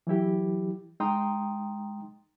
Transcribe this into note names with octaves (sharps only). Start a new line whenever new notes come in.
E3 F#3 E4 G4
G#3 D#4 G5 A#5 C6 D#6